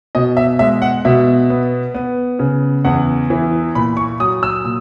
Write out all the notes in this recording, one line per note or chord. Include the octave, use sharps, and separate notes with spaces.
B2 D#5
E5
G#3 E5
F#5
B2 E5
B3
B3
C#3
E2 F#5
E3
A#2 B5
C#6
F#3 D#6
E6
A#2